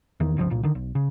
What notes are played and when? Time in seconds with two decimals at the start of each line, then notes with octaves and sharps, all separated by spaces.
0.20 E2 D#3
0.37 G1 C#2 C#3 F3
0.50 C2 A#2
0.63 D3 D#3
0.75 B1
0.95 C#3